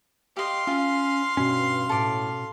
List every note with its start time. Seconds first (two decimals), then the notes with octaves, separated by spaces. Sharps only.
0.37 G4 D#5 F5 C6
0.67 C#4 F4
1.37 G2 B2 C#4
1.89 A2 A4 D6